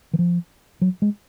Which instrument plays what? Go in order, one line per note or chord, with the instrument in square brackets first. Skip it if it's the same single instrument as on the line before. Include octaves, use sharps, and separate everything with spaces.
[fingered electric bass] E3
F3
F#3
G#3